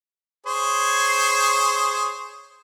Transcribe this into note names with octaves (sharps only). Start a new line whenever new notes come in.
G#4 C5 C#5